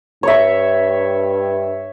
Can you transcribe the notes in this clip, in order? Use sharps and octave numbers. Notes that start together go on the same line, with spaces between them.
G2 C#5 E5